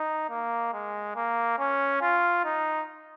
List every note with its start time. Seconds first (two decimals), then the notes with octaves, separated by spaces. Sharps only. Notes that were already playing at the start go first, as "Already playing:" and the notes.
Already playing: D#4
0.30 A#3
0.73 G#3
1.16 A#3
1.59 C#4
2.02 F4
2.45 D#4